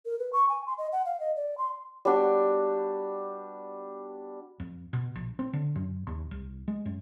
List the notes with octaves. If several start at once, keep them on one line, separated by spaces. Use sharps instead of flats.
A#4
B4
C#6
G#5
C6
D#5
F#5
F5
D#5
D5
C6
G3 B3 D4 F#4
F2
B2
A#1
C4
D3
F#2
D#2
C2
G#3
F#2